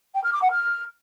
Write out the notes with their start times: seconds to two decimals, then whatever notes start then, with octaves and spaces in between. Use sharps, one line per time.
0.14 G5
0.23 F6
0.33 D6
0.42 F#5
0.51 F6